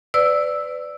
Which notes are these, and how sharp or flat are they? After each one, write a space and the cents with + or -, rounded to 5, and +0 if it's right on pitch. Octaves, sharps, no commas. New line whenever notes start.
B4 +30 D5 +0 E6 +0